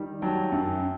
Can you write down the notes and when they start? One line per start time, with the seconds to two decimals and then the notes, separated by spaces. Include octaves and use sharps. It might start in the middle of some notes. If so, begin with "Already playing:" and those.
Already playing: D#3 G3
0.22 F#3 G5 A5
0.52 F#2